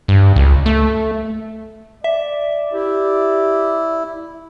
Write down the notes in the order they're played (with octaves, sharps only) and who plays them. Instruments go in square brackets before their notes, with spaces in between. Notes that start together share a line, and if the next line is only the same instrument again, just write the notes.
[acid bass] G2
C#2
A3
[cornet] D5 [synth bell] E5
[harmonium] E4 [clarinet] G4